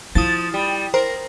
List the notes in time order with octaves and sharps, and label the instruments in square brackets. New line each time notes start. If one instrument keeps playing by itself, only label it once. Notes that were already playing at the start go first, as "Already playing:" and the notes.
[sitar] F3 [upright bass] E4 [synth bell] D#6 A6
[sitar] G3
[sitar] A#4 [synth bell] C5